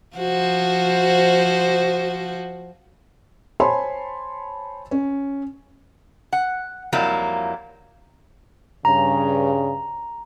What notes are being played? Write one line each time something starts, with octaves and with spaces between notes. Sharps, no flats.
F3 F#4 C5
C5 C#5 G#5 A5 B5 C6
C#4
F#5
F2 F#3 G3 A#3 E4
G2 C#3 A#5